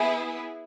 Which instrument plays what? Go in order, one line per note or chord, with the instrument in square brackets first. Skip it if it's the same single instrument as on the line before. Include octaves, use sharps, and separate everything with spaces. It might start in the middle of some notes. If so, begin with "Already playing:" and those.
Already playing: [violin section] B3 E4 G#4